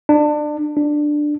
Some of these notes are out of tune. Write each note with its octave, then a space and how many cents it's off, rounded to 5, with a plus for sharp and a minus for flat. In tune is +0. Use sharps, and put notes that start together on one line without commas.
D4 +25
D4 +10